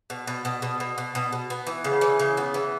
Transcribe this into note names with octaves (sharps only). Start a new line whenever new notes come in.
B2
B2
B2
B2
B2
B2
B2
B2
B3
E3
C#3
E3
C#3
B3
E3